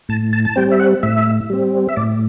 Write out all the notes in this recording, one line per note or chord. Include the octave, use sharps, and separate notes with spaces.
A2 A5
A5
A5
G3 C4 G5
E5
F#5
A2 E5
G3 C4
E5
A2 D5